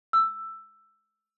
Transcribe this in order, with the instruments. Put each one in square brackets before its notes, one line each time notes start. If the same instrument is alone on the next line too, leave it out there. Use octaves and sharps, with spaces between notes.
[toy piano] E6